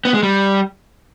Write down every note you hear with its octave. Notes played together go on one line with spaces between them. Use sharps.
B3
G#3
G3